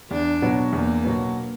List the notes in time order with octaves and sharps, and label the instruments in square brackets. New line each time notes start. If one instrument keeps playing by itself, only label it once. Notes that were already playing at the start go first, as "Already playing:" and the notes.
[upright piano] E2 [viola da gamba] D4
[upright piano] B2 F#3 B3
[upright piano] E2 [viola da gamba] A#3
[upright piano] B2 F#3 B3